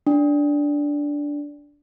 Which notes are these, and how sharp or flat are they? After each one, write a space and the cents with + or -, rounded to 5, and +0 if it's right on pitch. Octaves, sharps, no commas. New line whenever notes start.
D4 -10